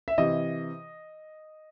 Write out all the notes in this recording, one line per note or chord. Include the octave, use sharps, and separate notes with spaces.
E5
C3 E3 D#5